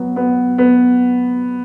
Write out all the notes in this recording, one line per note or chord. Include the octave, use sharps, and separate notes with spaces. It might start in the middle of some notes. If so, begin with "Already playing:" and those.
Already playing: F#3 B3
B3
B3